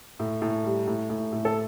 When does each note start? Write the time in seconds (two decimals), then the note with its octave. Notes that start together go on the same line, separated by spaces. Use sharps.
0.19 A2
0.42 A2
0.64 G3
0.87 A2
1.10 A2
1.32 A2
1.45 A4